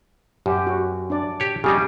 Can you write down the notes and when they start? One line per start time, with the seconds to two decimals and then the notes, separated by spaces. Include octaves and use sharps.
0.46 F#2 G4
0.67 F#4
1.10 D4 D5
1.40 G4 C#5
1.64 C#3 G3 D#4 G4 G#4